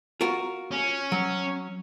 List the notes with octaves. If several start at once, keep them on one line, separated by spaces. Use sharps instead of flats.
F4 F#4 A#4
C#4
F#3